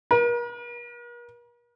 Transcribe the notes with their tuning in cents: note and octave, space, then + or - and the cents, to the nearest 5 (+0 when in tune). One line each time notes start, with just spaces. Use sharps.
A#4 +45